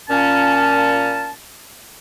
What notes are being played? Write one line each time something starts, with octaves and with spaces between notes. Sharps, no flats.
A#2 C#4 A5